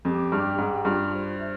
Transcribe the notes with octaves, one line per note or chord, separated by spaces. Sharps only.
F2 G4
G2 G5
G#2 G4
G2 F4
C5
E5